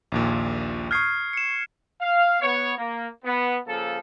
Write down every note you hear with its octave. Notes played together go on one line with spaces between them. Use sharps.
A#1 D#2 A#2
C#6 D#6 F6 G6 G#6 C7
C#7 E7
F5
B3 C#5
A#3
B3
C#3 F3 A#3 A4